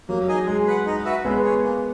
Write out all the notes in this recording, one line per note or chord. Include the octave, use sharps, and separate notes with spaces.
F#3 A#3
D#4 G#4 D#5 G#5
G#3 G#4
B4 F#5
D#4
F#4 B4 E5
G#3 B3 C#4
G#4 C#5
A#3